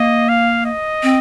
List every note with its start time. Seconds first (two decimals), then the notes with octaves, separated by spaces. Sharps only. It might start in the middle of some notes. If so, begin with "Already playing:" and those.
Already playing: A#3 D#5
0.29 F5
0.66 D#5
1.03 C4